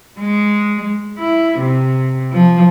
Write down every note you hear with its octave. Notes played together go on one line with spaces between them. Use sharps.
G#3
E4
C3
F3